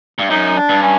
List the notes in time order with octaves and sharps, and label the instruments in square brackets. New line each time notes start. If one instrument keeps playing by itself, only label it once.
[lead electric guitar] G2
[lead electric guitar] F#2 [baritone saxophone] D#4
[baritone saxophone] D4
[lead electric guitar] G2
[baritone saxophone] C#4